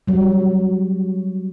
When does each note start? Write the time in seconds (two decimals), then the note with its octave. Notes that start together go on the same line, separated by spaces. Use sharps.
0.08 F#3 G3